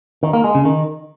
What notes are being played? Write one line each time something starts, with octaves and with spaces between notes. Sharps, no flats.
D#3
A#3
G#3
C#3
D#3